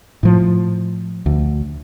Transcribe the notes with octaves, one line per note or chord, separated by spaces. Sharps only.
A2 F3
D2